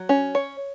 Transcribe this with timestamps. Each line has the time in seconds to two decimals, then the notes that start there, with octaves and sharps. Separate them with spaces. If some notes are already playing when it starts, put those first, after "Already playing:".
Already playing: F#3
0.09 C#4
0.35 C#5